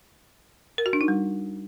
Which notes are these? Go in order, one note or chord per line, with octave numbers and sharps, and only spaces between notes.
A#4
F#4
D4
D#4
G3